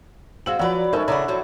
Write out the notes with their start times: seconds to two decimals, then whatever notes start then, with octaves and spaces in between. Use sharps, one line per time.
0.46 G#3 C4 F#4 F5 E6 F#7
0.59 F3 F#3 B4 D5 F#5 A#5 B5 E6
0.93 G#3 A3 C4 C#4 D#4 A4 A#4 D#5
1.08 C#3 D4 E4 D5 F#5 A#5
1.28 F3 F#3